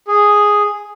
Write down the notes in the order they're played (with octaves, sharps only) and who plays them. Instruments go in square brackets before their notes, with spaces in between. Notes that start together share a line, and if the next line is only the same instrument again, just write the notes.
[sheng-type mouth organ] G#4